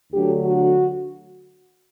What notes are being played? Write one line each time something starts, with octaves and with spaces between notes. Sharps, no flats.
D2 D3 F#3 G4
F#4